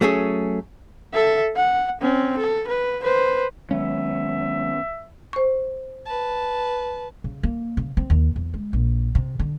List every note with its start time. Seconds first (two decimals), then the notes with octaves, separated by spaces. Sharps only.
0.01 F#3 A3 C#4 G#4
1.14 A4 E5
1.56 F#5
2.01 C4 C#4
2.38 A4
2.68 B4
3.03 B4 C5
3.71 D#3 F#3 G#3 B3 C#4 E5
5.33 C5 C#6
6.06 B4 A5
7.24 C#3
7.43 A#3
7.77 C#3
7.97 C4
8.10 D#2
8.36 E2
8.54 G#3
8.73 A#1
9.15 C3
9.39 D3